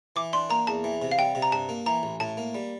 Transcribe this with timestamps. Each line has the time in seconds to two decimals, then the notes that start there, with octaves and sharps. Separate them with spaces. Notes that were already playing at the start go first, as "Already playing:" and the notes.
0.16 E3 D6
0.33 D4 C6
0.50 A#3 A#5
0.67 E2 A5
0.84 E3
1.02 C3
1.11 F5
1.18 G3 G5
1.35 C3
1.42 A#5
1.52 G2 A5
1.69 A#3
1.86 E3 A#5
2.03 A1
2.20 A2 A5
2.37 A#3
2.55 G3